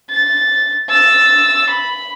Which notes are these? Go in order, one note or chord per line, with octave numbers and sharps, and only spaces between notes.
A6
E6 A6
B5